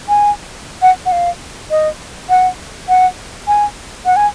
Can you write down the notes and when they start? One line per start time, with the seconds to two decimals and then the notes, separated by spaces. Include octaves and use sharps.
0.09 G#5
0.82 F#5
1.06 F#5
1.12 F5
1.71 D#5
2.30 F#5
2.89 F#5
3.47 G#5
4.06 F#5
4.16 G#5